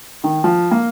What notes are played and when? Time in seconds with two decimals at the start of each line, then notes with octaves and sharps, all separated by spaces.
0.24 D#3
0.44 F3
0.71 A#3